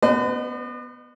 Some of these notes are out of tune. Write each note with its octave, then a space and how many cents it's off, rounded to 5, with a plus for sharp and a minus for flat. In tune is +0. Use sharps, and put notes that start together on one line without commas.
B3 +0 B4 +45 D#5 -40